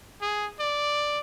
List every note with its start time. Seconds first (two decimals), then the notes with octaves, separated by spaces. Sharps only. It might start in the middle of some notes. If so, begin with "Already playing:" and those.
0.21 G#4
0.59 D5